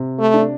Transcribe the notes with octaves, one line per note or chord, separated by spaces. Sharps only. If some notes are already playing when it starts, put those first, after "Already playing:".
Already playing: C3
A3
D4